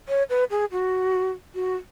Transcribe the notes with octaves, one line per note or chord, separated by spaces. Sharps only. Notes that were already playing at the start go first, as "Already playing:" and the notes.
C#5
B4
G#4
F#4
F#4